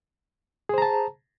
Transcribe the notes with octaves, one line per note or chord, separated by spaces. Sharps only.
G#4 C5 A5 A#5